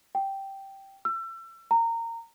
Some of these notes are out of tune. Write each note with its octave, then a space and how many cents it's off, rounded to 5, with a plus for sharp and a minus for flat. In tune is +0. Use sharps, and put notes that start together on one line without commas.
G5 -5
E6 +30
A#5 -20